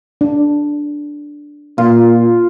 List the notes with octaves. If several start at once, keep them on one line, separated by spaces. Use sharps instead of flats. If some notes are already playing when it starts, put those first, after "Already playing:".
D4
A#2 F4